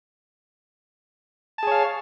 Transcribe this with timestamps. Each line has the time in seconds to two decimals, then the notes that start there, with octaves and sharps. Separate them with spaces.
1.58 A5
1.63 G#4
1.67 C#5
1.72 F5